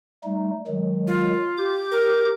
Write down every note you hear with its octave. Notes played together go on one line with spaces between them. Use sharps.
G3 A3 D#4
D#3 F#3 G#3
F4
G4 D6 G6
A#4